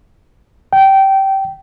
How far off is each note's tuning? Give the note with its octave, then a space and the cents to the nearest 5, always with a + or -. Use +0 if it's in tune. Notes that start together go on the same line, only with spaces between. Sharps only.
G5 -20